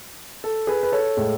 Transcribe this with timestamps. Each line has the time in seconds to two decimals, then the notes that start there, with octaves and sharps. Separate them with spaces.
0.44 A4
0.67 G#4 B4
0.83 B4
0.92 A4 C#5
1.17 A2 G#3